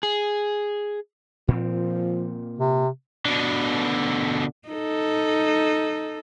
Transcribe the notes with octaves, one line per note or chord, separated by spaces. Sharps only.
G#4
A#2 F3 C4
C3
B2 D3
D#4 A4